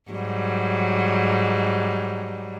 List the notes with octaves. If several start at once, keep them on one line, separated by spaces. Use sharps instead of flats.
G#2 F#3 G3